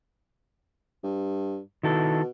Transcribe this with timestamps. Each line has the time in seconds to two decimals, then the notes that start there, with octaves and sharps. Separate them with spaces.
1.04 G2
1.83 B2 D#3 E4 A4